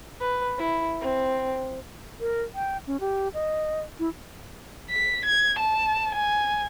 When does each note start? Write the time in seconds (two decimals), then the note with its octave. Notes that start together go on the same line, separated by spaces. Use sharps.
0.21 B4
0.58 E4
1.01 C4
2.21 A#4
2.55 G5
2.87 C#4
3.00 G4
3.34 D#5
3.99 E4
4.90 B6
5.26 G#6
5.59 A5
6.15 G#5